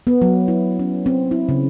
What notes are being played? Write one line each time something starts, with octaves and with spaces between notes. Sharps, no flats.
B3
F#3
E4
C#4
C4
E4
C#3